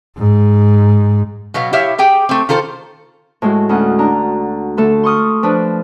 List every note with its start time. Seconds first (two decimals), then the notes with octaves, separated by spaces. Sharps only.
0.18 G#2
1.54 B2 F#3 B3 F5
1.73 E4 G4 C#5 E5 F5
1.98 G4 G#4 G5
2.29 A3 C4
2.49 D#3 F4 A4 C5
3.42 A2 G#3 F#4
3.69 D2 C#4 F#5 D#6
3.99 D4 A#5
4.77 D3 A3 A4
5.03 C6 C#6 D#6 F6
5.43 F3 D4 B4